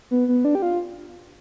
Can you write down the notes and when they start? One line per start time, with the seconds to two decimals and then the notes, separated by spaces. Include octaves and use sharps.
0.11 B3
0.28 B3
0.45 D4
0.55 G4
0.62 F4